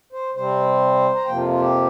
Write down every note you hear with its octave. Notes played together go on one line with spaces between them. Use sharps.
C5
C3 G3 C4 C5
A#5
F2 C3 F3 A#3 G5
F4
F4
G4